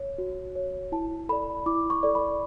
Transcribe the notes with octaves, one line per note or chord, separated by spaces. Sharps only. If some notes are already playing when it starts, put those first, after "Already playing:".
Already playing: C#5
F#4
C#5
E4 A5
A4 D5 B5
E4 D6
C#6
A4 D5
B5